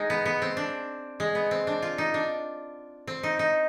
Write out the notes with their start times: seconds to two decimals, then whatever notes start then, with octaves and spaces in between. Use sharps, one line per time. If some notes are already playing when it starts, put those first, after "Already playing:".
Already playing: G#3 D#4
0.10 B3
0.26 B3
0.42 C4
0.57 D4
1.20 G#3
1.35 B3
1.51 C4
1.67 D4
1.82 F4
1.98 D#4
2.14 D4
3.07 C4
3.23 D#4
3.39 D#4